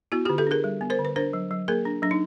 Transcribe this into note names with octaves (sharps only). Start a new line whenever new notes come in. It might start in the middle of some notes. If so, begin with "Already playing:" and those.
B3 E4 F#4
D3 F4 G4
G4 A4
D4 G#4 A#4
G3
B3
A#4 C5
D3
B4
D4 A#4 C5
F#3
F#3
A#3 G#4 A#4
D4
F#3 D4
D#4